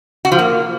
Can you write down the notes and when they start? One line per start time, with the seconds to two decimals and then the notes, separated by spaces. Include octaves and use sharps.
0.25 F#4
0.32 F3
0.39 A#3